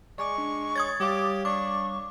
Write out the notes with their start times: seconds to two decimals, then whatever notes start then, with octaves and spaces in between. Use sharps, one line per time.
0.18 G#3 D5 G#5 C#6 D6
0.38 D4
0.76 C#5 D#6 G#6 A6
1.00 G3 G4 C#5 F5 D6
1.45 D4 C#6 D6